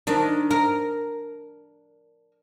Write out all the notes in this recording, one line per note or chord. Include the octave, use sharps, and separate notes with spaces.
D#3 D4
A#4